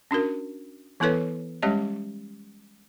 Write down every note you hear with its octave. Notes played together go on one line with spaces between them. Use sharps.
C#4 D4 F#4 A#4
E3 B3 E4 A4 B4 C#5
G3 G#3 C#4 G4 C#5 D#5